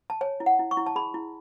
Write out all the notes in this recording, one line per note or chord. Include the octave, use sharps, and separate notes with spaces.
A5
C#5 G#5
E4
F#5
E4
C#6
E4
A5
G#4 B5
E4